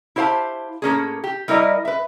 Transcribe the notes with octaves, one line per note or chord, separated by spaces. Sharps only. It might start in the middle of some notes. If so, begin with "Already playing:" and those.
E4 G4 C5 F5 A5
A2 A#3 C#4 G#4
G4
G3 E4 A#4 D5 D#5
B4 E5